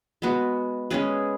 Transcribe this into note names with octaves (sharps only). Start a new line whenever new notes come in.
G#3 B3 F#4
G#3 C#4 G#4 B4